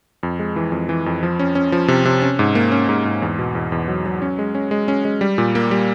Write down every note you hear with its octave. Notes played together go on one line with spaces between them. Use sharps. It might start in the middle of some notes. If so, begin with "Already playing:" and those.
F2
G#3
E3
F2
E3
F2
F3
C#4
C#4
F3
C3
C3
C#4
G#2
A#3
C#4
G#2
G#2
E2
B2
E2
E2
F#3
F#3
C#4
G#3
C#4
G#3
C#4
G#3
G3
A#2
A#3
G3